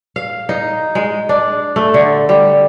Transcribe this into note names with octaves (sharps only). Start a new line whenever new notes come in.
F5
D#4
G#3
D4
A3
D3
G3